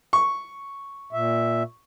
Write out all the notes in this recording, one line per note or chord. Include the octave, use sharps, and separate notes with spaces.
C#6
A#2 E5